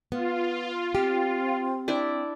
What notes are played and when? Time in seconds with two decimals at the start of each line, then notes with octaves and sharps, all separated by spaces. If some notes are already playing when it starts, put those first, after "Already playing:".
0.12 B3 F4
0.95 C4 G4
1.88 D4 E4 D5